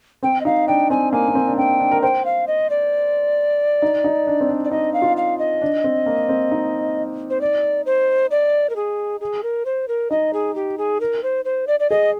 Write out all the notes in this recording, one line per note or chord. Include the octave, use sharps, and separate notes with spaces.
C4 G5
D#5
D#4 F5
D4 G5
C4 G#5
A#3 G#5
A#3
C4
D4
C4 G5
D4
A#4
C5 G5
F5
D#5
D5
D#4
D#4
D4
C4
D4
D5
D#4 D#5
F5
F4
F5
D#5
D4
C4
A#3
C4
D#4
C5
D5
C5
D5
A#4
G#4
G#4
A#4
C5
A#4
D#4 D#5
G#4
G4
G#4
A#4
C5
C5
D5
D5
G#4 D#5